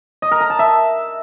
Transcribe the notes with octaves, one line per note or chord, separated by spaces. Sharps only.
D#5
A#4
A#5
A5
E5